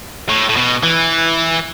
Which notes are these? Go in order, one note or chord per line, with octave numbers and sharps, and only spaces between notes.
A2
A2
B2
E3